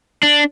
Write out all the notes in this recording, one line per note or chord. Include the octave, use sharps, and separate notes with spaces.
D4